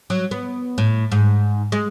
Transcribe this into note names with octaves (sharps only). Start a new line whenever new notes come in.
F#3
B3
A2
G#2
G#3